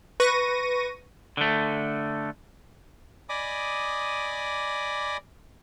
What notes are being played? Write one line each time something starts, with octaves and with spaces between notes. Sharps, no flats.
B4 C#6 A#6 D#7
D3 A3
D5 D#5 G#5 B5 D6 D#6